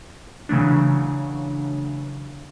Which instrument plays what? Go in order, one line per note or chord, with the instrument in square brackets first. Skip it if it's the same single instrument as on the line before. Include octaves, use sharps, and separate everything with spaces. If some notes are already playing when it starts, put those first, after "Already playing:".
[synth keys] C#3 E3 F#3 A3 D4